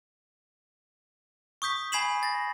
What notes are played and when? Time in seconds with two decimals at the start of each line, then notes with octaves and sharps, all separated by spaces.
1.62 C#6 D#6 G6 B6
1.92 G#5 B5 G#6 C7 E7 F#7
2.23 A6 A#6